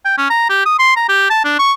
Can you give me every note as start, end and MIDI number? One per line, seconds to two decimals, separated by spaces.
0.05 0.15 79
0.18 0.28 61
0.30 0.49 82
0.50 0.64 67
0.66 0.79 87
0.79 0.95 84
0.96 1.06 82
1.09 1.29 67
1.30 1.41 81
1.44 1.58 62
1.59 1.73 85